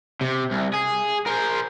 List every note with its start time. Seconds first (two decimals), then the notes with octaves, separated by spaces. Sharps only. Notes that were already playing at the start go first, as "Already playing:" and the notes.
0.21 C3
0.52 C2
0.74 G#4
1.26 A#4 C5